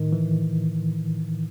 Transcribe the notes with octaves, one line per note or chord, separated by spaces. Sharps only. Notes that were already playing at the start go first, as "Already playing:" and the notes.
Already playing: A2 D#3
E3